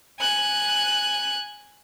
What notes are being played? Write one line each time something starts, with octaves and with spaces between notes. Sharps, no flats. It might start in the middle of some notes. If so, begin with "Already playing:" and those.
G#5 F#6